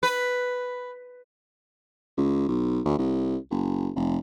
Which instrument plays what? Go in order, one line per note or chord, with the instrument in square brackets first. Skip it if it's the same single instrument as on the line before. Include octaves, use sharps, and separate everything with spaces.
[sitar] B4
[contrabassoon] C#2
B1
D2
C2
F#1
F1